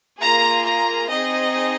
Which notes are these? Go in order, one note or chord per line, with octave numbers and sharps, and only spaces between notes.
A#3 F4 G#4 A#5
A#5
C4 D#4 G#4 D#5